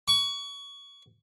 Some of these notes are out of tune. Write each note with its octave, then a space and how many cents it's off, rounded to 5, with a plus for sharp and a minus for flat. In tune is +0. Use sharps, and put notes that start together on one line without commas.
C#6 +25